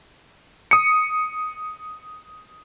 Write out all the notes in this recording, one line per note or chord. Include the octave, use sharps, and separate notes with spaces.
D#6 C#7